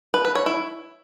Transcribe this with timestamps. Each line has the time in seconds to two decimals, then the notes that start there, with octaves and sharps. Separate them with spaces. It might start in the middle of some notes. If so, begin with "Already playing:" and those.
0.14 B4
0.25 B4
0.35 C#5
0.46 E4